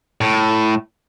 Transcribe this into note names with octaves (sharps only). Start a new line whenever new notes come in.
A2